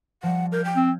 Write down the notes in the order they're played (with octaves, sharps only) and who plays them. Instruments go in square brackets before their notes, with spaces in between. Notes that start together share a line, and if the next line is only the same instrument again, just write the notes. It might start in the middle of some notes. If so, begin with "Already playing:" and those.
[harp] F3 G3 [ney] F#5
[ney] A#4 [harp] F6 G6 G#6
[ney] G5
[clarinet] C4